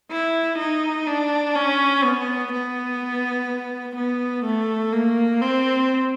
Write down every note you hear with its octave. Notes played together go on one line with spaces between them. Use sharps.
E4
D#4
D4
C#4
B3
B3
B3
A3
A#3
C4